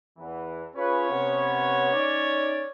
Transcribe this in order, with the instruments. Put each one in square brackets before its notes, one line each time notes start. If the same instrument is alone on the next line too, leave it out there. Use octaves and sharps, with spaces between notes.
[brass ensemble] E2 E3
[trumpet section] C#4 C#5 [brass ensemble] F4 G#4 B4
[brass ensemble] C3 B3
D#4 D5